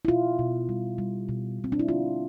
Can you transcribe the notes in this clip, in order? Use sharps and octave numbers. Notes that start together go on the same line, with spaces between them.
E4
B2 F4
B2
G3
G3
B2
B2
C4
D4
E4
D3 F4